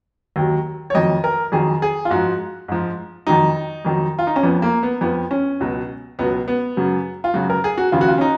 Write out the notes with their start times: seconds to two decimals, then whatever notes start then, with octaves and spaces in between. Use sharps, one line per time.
0.36 D#2 D#3 F#3
0.90 C#5
0.94 F2 D#3 F#3 D#5
1.24 A#4
1.52 F2 D#3 F#3 G#4
1.82 G#4
2.05 F4
2.10 G#2 F3 F#4
2.68 G#2 F3
3.27 F2 D#3 F#3 D#4
3.85 F2 D#3 F#3
4.19 F4
4.27 D#4
4.36 C#4
4.43 F2 F3 B3
4.62 A#3
4.83 B3
5.01 F2 F3 B3
5.31 C#4
5.60 C#2 B2 F#3
6.19 C#2 B2 F#3 B3
6.48 B3
6.77 F#2 C#3 F#3
7.24 F4
7.34 F#2 C#3 F#3 F#4
7.50 A#4
7.64 G#4
7.78 F#4
7.92 D#2 C#3 F3 F4
8.01 F#4
8.08 F4
8.18 C#4
8.21 D#4